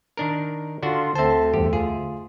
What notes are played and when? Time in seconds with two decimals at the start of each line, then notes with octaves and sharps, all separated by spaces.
0.17 D#3 D4 A#4
0.82 D3 D4 F4 F#4
1.15 D2 D3 C4 C5 E5 A5
1.54 E2 G2 G4
1.73 F4 G#4